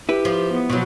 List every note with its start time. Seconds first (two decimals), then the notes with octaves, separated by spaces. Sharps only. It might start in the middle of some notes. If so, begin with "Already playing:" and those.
0.09 E4 G4 B4
0.25 F3
0.52 B3
0.70 B2 F3 F#3